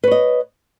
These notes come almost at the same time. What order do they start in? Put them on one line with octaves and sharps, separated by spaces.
B4 C#5 D#5